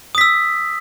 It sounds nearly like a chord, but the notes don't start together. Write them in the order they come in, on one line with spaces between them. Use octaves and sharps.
D#6 B6 E6